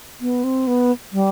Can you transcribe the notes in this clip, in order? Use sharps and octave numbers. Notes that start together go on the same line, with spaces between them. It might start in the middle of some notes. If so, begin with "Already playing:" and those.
B3
C4
B3
G3